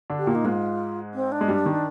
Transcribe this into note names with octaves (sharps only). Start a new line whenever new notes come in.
D3 D4
G4
A#2 A#3
D#4
G#2 G#3 F4
C4
D4
G#3
G2 G3
D#3